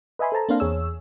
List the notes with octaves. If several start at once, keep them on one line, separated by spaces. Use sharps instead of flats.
B4 D#5 E5 G#5 B5 C6
A4 C5 A5 A#5
A#3 C4 D4 C5 F5
E2 G#4 C#5 E6